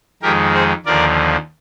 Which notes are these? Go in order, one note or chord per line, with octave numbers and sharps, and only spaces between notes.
F2 D#3 G#3 G4 A#4
G#4 C5
D#2 D3 F3 A#4 D5